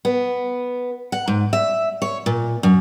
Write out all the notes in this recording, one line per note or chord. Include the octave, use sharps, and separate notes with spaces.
B3
F#5
G#2
E5
C#5
A#2
F#2